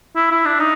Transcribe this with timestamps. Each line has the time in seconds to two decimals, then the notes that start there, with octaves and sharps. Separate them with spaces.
0.16 E4
0.31 E4
0.45 D4
0.60 D#4